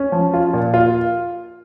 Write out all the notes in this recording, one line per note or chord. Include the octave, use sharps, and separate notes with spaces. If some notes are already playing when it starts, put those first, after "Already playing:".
Already playing: C#4
F3
F4
A#2
F4